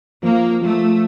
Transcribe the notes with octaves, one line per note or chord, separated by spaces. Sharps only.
F3 A#3
F3 A3